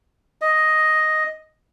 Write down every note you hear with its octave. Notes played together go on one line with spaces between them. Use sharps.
D#5